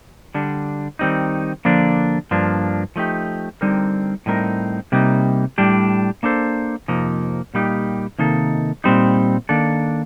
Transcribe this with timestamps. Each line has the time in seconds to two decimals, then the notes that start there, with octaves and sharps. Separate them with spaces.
0.34 D3 G3 D4
0.99 D#3 G3 C4 D#4
1.65 D3 F3 A#3 D4
2.31 G2 F3 A#3 D4
2.96 F3 A3 D#4 G4
3.61 D3 G3 C4 D#4 A#4
4.26 A2 G3 C4 D#4 A#4
4.92 C3 G3 A#3 D#4
5.58 A2 G3 D4 G4
6.23 A#3 D4 A4 C5
6.88 F2 C3 F3 A#3 D#4
7.54 A#2 G3 A#3 D#4 G4
8.19 C3 D#3 A#3 D#4 A4
8.84 A#2 G3 C4 D#4
9.49 D#3 A#3 D4 A4